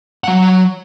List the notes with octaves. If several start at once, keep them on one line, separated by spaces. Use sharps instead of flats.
F#3 F#5